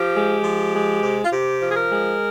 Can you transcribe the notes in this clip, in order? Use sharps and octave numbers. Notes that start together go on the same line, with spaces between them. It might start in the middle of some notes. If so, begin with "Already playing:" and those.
Already playing: F3 G4
G#3
F3
G#3
C3
F4
C3 G4
F3
G#4
A#4
G#3